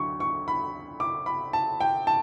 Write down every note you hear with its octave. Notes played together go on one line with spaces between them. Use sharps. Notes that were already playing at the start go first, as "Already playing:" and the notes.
Already playing: D2 D3 F#3 C#6
C#6
B5
D6
B5
A5
G5
A5